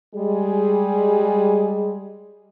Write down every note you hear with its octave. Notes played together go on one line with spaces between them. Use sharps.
G3 G#3 G#4